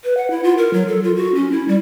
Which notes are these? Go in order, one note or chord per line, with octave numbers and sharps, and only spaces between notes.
B4
F#5
E4
F4
A#4
F#3
A4
F4
F#4
C#4
E4
G3